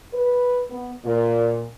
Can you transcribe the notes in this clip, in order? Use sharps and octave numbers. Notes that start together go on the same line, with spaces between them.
B4
B3
A#2